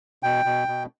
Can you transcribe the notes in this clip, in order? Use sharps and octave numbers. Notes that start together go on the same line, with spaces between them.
B2 G5
B2
B2